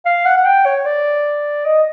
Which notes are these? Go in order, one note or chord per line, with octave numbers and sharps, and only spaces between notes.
F5
F#5
F#5
G5
C#5
D5
D#5